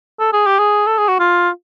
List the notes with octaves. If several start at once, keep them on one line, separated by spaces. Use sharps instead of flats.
A4
G#4
G4
G#4
A4
G#4
F#4
F4